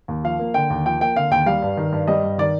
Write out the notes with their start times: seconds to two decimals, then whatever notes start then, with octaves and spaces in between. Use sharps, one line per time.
0.08 D#2
0.24 F3 F5
0.39 A#3
0.54 D3 G5
0.70 D#2
0.85 F3 G5
1.00 A#3 G5
1.16 D3 F5
1.31 D#2 G5
1.46 G3 F5
1.62 G2
1.77 D#3
1.92 G2
2.07 G3 D#5
2.23 G2
2.38 D#3 D5